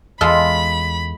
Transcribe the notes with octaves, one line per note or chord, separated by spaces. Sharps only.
E2 G#3 F4 A4 B5